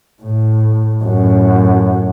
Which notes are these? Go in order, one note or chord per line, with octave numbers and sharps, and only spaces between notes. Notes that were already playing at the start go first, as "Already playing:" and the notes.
A2
F#2 A2